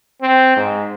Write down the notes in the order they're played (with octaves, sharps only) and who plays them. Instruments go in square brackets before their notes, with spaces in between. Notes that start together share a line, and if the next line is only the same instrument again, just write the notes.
[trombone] C4
G#2